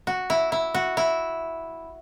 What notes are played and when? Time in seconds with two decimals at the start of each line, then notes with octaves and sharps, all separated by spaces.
0.07 F#4
0.30 E4
0.52 E4
0.74 F#4
0.97 E4